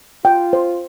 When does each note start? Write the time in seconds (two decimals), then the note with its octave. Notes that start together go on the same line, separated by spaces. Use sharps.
0.25 F4 G5
0.53 C5